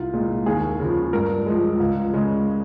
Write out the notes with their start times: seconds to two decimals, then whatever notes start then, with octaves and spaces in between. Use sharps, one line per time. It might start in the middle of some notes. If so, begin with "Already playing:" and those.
Already playing: C2 F4
0.13 A#2 G#3
0.46 D#2 G#4
0.80 C#3 F3
1.13 G2 A#4
1.46 F3 G#3
1.80 C#2
2.14 C#3 G#3